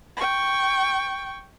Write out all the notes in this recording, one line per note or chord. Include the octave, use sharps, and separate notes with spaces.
G5 C#6